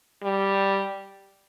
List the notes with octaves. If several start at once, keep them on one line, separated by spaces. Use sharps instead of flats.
G3